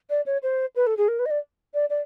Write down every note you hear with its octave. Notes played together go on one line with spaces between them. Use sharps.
D5
C#5
C5
B4
A4
G#4
A#4
B4
D#5
D5
D5
D5